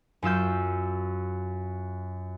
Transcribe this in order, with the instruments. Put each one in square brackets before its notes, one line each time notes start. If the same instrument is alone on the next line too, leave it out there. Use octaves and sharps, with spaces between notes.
[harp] F#2 F4 E6 G6